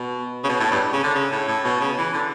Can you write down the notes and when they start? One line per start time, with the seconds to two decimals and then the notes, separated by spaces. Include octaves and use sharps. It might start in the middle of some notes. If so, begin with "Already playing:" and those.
Already playing: B2
0.45 C#3
0.49 B2
0.60 A2
0.71 G2
0.93 C#3
1.04 D3
1.15 C#3
1.32 A2
1.48 A2
1.65 B2
1.81 C#3
1.98 E3
2.14 D3